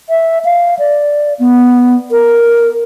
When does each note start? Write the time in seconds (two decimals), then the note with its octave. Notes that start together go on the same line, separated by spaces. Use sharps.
0.09 E5
0.45 F5
0.79 D5
1.39 B3
2.11 A#4